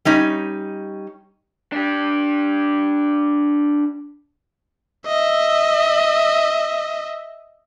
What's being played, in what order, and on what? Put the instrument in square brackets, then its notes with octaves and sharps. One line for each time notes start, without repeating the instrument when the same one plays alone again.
[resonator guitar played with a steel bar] G3 C#4 D#4
[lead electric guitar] D4 G4
[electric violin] D#5 E5